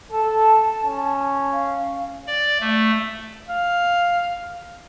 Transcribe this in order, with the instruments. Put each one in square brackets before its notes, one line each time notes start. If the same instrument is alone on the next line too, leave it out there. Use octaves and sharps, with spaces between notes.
[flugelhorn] A4 [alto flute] A5
[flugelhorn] C#4
[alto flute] F5
[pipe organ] D5
A3
[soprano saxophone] F5